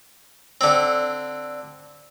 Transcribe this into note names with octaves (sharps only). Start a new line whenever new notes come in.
D3 C4